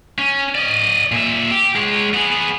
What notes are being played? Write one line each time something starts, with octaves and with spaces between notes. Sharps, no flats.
C#4
D5 D#5
A#2 E5
G4
G#3 C#5
B3 G#4